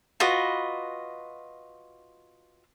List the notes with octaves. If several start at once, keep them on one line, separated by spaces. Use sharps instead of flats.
F4 F#4 B4 D#5